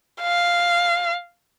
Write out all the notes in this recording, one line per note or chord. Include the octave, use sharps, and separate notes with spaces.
F5